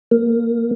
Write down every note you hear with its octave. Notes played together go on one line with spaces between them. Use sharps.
A#3